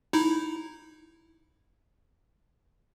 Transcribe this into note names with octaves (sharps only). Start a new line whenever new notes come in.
D#4 E4